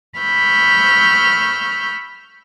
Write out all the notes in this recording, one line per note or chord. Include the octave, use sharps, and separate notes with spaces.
B5 C#6 E6 F6 G6